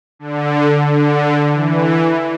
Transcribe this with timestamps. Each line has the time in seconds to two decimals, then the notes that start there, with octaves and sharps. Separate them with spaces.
0.19 D3
0.87 D3
1.53 E3